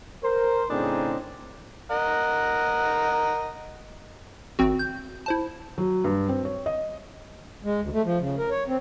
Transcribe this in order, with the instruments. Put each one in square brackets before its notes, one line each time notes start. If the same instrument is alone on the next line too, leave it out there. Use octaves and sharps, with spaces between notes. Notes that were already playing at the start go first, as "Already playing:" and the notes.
[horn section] A#4 C5
A2 C#3 C4 D4 D#4 G#4
[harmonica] A#4 D#5 F#5
[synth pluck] G#1 C4 F#4
G6
E4 C5 A5
[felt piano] F#3
G2
C4
C#5
D#5
[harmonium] G#3
D2
A3
F3
C#3
A#4
C#5
C4